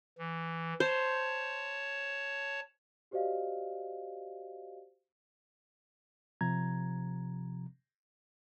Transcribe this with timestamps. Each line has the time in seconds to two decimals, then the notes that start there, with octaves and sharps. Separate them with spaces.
0.19 E3
0.80 C5 C#5 A5
3.11 F#4 G4 C5 D5 D#5 F5
6.41 C3 F3 A#5 G#6